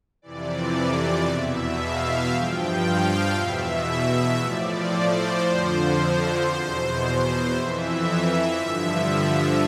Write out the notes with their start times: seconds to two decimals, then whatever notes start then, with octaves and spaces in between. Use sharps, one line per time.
0.22 F2 C3 E3 D5
1.25 E2 B2 E5
1.79 F5
2.30 G2 F3 G5
2.83 F5
3.34 E2 B2 E5
4.38 A2 F3 D5
4.90 C5
5.42 F2 D3 F3
5.93 C5
6.45 E2 B2
7.49 F2 E3 E5
8.53 G2 D3 F3 E5